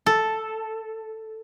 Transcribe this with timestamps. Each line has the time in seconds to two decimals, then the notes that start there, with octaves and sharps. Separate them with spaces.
0.06 A4